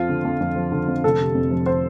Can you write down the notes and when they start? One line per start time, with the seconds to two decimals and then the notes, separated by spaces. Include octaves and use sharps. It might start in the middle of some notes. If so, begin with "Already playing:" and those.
Already playing: F2 F3 F4
0.09 D3
0.25 F2
0.41 F2
0.56 F3
0.72 D3
0.88 F2
1.04 F1 A4
1.20 C3
1.35 F2
1.51 F3
1.66 C5